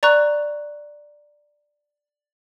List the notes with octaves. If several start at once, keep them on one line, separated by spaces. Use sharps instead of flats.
D5 A#5 C#6 F#6